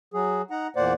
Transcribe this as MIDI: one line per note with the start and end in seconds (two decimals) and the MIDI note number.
0.14 0.42 54
0.14 0.42 68
0.51 0.67 63
0.51 0.67 78
0.51 0.67 82
0.76 0.93 40
0.76 0.93 46
0.76 0.93 58
0.76 0.93 72
0.76 0.93 74
0.76 0.93 78